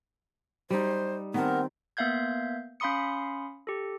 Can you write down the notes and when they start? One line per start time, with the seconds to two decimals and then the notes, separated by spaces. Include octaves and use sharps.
0.70 G3 D#4 C5
1.34 D#3 B3 C4 A#4 F#5 A5
1.97 A#3 B3 E5 F5 G6 G#6
2.80 C#4 F5 B5 C6 D#6 C#7
3.67 G4 A4